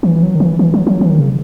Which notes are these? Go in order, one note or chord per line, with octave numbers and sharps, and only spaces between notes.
E3
F#3
D#3
E3
E3
F#3
F#3
E3
D#3
C#3